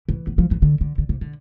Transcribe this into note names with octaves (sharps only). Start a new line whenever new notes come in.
E3
B3
F3
E3
D3
D3
D3
C3
D3